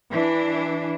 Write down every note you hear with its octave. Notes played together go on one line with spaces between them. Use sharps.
E3 D4